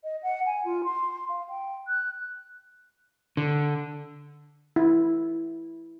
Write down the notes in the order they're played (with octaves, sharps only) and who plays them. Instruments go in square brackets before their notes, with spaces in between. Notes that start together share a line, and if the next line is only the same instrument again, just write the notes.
[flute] D#5
F#5
G#5
F4
C6
F5
G5
F#6
[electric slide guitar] D3
[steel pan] E4